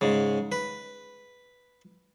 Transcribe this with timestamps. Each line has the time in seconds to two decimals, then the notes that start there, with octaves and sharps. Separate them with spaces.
0.01 G#2 C#3
0.52 B4